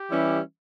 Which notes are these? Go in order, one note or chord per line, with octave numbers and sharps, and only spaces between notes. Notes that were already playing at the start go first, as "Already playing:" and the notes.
Already playing: G4
E3 G3 C#4 E4